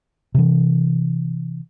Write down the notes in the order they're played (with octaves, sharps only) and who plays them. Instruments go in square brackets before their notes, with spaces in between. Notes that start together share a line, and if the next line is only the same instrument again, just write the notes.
[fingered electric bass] C3 E3